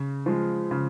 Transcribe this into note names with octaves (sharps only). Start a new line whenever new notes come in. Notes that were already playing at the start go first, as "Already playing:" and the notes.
Already playing: C#3
F3 G#3
C#3